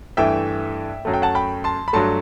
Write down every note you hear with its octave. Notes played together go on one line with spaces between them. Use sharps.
G2 E3 A3 E5 G5
F#2 F#3 A3 A5
G5
F#5 A5
G5 B5
A5 C6
B5
G2 F#3 A3 A5 C6